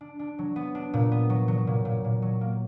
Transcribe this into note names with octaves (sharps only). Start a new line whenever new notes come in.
D4
D4
F#3
B3
D4
A#2
B3
F#3
F#3
A#2
A#2
A#2
F#3
A#3